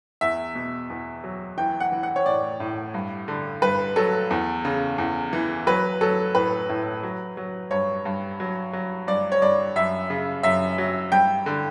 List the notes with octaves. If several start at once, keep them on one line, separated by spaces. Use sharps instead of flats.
E2 E5
B2
E2
F#3
E3 G5
F#5
E3
F#5
C#5
A2 D5
A2
G2
D3
G2 B4
F#3 A4
E2
C#3
E2
E3
F#3 B4
F#3 A4
A2 B4
A2
F#3
F#3
G2 C#5
G2
F#3
F#3
G2 D5
C#5
G2 D5
F#2 E5
C#3
F#2 E5
F#3
G2 G5
D3